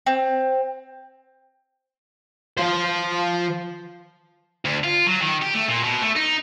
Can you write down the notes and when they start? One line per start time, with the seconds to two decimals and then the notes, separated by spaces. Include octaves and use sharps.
0.06 C4
2.58 F3 C5
4.65 D2
4.84 F4
5.07 F#3
5.21 D#3
5.42 G4
5.54 A3
5.68 A#2
5.83 B2
6.02 A3
6.16 D#4